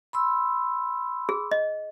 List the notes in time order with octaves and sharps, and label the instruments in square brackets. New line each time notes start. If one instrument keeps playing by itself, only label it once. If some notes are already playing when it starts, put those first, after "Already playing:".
[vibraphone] B5 C6 E6
[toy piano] G#4
D#5